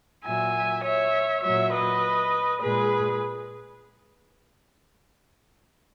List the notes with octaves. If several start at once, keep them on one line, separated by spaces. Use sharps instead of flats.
A#2 F#3 E5 G#5
C#5 E5
A#2 F#3 C#5 E5
B4 D#5
A#2 G#3 G#4 B4